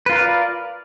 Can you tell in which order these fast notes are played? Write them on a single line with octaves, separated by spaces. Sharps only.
B4 F4 A#4 F5 D5